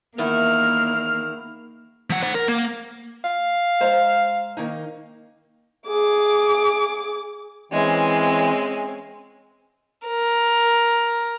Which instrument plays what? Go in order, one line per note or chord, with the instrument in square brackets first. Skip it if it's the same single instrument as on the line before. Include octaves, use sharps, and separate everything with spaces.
[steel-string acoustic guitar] E2 D#3 E4 [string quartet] A#3 F6
[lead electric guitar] F3 F#5
C5 F#5
A#4
A#3
[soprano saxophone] F5
[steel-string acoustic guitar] G#3 C5 A#5
D#3 A#3 D#4
[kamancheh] G#4 D6
[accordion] E3 [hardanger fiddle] G#3 [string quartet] C4 C#4 G#5
[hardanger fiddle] A#4